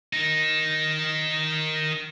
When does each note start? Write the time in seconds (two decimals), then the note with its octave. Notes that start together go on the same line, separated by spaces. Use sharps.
0.13 D#3 D#4